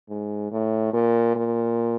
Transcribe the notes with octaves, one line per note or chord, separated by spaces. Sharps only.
G#2
A2
A#2
A#2